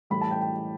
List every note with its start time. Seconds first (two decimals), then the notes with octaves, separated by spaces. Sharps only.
0.10 A2 E3 G3 B5
0.21 A5
0.31 G5
0.41 G5